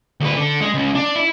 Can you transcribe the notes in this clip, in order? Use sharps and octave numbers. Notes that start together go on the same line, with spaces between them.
D2 B4
D3
G#3
C#2
D4
E4